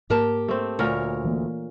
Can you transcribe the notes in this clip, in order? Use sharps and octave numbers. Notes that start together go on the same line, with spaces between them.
G#2 A#3 G4 A#4 A5
A3 C4
D2 A#2 A#4 C#5
E3 A3 A#3